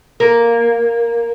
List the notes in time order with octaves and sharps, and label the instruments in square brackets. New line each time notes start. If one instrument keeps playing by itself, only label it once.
[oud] A#3